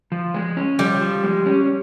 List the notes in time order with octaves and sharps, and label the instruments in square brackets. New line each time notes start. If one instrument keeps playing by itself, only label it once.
[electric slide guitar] F3
G#3
C#4
[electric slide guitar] F3 [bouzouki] G3
[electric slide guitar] F3
G#3
C#4